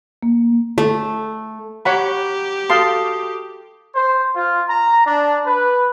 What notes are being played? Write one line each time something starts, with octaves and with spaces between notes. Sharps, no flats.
A#3
A3
G4 C#5 F#5 A#5 B5
F#4 A4 F5 A5 C6 D#6
C5
F4
A#5
D4
B4